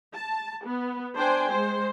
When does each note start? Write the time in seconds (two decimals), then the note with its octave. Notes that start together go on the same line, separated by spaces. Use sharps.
0.14 A5
0.67 B3
1.16 D4 C5 G5 G#5
1.50 G#3 C5